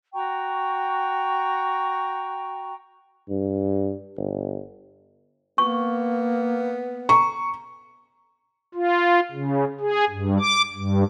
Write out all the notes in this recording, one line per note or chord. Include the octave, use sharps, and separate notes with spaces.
F#4 G5 A#5 C#6
G2
G1
A#3 B3 C#6
A#5 C#6
F4
C#3
G#4
G2
D6
G2